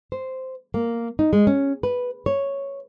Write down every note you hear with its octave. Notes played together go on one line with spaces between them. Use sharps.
C5
A#3
D#4
G#3
C#4
B4
C#5